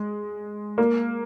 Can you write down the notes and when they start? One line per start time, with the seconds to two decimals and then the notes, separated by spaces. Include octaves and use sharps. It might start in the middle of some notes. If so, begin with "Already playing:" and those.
Already playing: G#3
0.78 A#3